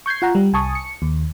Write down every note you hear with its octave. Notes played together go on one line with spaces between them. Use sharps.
C#6 G6 G#6 C7
F4 F#5 A#5
G3
C2 G#5 A5 C#6 D#6
C#7
D#2